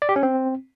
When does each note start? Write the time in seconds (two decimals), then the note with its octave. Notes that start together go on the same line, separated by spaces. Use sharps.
0.02 D5
0.09 G4
0.16 C#4
0.23 C4